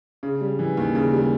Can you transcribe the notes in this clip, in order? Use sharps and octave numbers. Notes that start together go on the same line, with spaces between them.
C#3
G3
E3
D#2
C#3
G3